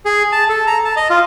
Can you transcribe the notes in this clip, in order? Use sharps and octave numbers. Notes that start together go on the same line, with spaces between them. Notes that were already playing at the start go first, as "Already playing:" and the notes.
G#4
A5
A4
A#5
A5
D#5
F4